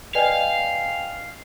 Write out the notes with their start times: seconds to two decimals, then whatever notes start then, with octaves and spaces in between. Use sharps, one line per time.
0.15 B4 D5 D#5 F5 G5 G#5